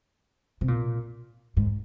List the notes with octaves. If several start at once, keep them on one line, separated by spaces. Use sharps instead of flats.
C3
A#2
G#2